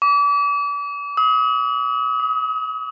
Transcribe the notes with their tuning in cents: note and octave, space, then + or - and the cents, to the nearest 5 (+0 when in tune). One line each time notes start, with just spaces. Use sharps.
D6 -35
D#6 +40
D#6 +20